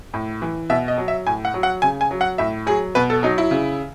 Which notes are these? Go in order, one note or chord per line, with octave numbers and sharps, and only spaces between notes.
A2
E3
B2 E5
D#5
F#3
E5
A2 G#5
F#5
F#3
F#5
C#3 G#5
G#5
F#3
F#5
A2 E5
F#3 G#4
B2 B4
A4
F#3 D#4
E4
C#3